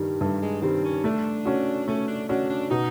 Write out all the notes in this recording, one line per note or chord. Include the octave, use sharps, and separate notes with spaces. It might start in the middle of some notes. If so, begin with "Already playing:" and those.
Already playing: G2 D#3 G3
G2 A3
G#3
D#3 G3 C4
C#4
A3 D4
C#4 F#4
A3 C#4
D4
C#4 D4 F#4
D4
B2 D#4